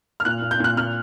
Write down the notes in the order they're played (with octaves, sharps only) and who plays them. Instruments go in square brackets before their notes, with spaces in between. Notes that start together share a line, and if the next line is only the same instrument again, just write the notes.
[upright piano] F6
A#2 F#6
A#2
G6
A#2 F#6
A#2 F6